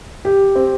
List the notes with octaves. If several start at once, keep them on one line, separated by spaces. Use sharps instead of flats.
G4
C4